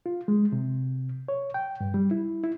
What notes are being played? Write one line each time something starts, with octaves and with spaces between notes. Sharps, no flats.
F4
G#3
C3
C#5
G5
G2
G3
E4
E4